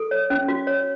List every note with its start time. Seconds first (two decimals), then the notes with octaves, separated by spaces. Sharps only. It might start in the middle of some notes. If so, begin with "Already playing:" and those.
Already playing: A4
0.11 C#5
0.30 C#4
0.48 F#4
0.67 C#5